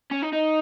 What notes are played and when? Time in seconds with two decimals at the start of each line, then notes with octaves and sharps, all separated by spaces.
0.11 C#4
0.22 D#4
0.33 D#4